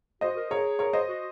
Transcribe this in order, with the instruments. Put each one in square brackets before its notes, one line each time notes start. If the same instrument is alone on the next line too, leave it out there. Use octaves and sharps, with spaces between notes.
[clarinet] F#4 [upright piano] C5 D#5
[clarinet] A#4
[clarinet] G#4 [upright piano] A#4 C#5
[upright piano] A#4 C#5
C5 D#5
[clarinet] F#4